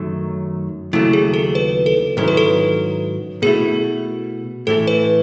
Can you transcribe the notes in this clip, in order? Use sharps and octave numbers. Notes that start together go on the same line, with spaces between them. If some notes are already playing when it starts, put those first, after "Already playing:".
Already playing: F#2 D#3 F#3 A3
D#2 C#3 F#3 A3 E4
G#4
A4
B4
A4
G#2 D#3 F#3 C#4 E4 A4
B4
A4
B2 A3 E4 G#4
A2 E3 A3 A4
B4